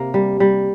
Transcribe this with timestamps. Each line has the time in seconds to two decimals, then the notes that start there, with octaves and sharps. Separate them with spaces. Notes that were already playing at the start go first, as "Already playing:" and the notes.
Already playing: C3 A#3
0.14 G3
0.40 G3